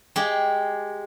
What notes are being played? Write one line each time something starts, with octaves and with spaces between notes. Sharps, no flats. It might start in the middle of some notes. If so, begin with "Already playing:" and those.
G#3 G4